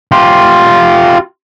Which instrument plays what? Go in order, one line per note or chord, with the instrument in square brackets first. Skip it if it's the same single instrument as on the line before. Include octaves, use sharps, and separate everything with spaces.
[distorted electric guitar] F4 G4